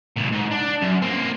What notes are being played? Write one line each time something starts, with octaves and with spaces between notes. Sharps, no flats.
C#2 A#2
G#2
D4
F#2
A#3 C4